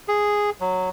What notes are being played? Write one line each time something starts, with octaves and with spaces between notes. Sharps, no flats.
G#4
F#3